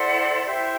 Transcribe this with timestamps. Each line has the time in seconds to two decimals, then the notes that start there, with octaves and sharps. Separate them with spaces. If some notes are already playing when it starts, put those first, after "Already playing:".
Already playing: E4 A4 C5 D5 F#5
0.43 E4 G4 C5 E5